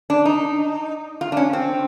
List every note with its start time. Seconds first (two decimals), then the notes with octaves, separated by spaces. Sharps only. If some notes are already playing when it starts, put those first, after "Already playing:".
0.10 D4
0.25 D#4
1.21 F4
1.32 D4
1.37 C#4
1.53 C4